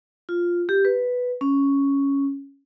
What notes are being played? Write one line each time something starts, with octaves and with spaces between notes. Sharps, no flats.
F4
G4
B4
C#4